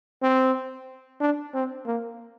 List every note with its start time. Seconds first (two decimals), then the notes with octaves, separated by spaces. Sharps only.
0.22 C4
1.21 D4
1.54 C4
1.86 A#3